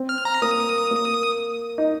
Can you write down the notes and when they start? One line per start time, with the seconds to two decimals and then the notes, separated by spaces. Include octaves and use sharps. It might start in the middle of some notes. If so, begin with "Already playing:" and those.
Already playing: C4
0.09 F6
0.25 A#5
0.42 A#3 D#6
0.91 A#3
1.78 D#4